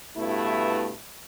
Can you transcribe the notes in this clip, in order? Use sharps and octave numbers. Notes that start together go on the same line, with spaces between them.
G2 B2 A3 E4